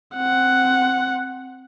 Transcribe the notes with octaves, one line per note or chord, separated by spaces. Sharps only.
C4 F#5